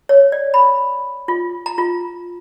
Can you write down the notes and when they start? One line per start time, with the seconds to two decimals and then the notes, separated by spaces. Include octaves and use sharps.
0.09 C#5
0.32 D5
0.54 B5
1.28 F4
1.66 A#5
1.78 F4